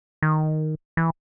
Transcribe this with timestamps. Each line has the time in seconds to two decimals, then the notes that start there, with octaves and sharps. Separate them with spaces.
0.22 D#3
0.97 E3